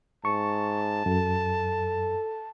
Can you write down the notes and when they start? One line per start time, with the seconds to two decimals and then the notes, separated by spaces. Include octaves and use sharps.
0.25 G#2 A5 C#6
1.06 F#2 A4